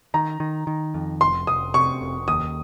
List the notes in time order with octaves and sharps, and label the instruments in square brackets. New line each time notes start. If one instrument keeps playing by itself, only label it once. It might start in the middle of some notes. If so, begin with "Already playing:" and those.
[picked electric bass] D#3 [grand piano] A#5
[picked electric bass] D#3
D#3
F2
[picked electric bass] F1 [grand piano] C6
[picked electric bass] F1 [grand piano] D#6
[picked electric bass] C3 [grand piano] C#6
[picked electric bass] F1
[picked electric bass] D#2 [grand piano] D#6